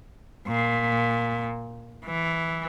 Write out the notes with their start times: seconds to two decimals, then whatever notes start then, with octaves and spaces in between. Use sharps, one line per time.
0.48 A#2
2.06 E3